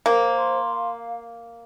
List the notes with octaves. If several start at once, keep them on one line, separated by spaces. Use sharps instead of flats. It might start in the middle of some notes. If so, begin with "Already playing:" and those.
A#3 C5
C6
F5